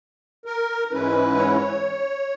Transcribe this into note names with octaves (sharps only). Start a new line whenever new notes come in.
A#4
A#4
G#2 E3 G#3 C#4 E4 B4
C#5
B4
C#5